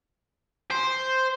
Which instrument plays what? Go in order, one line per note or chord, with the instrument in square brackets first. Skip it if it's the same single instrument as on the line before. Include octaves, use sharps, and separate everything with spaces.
[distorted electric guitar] C5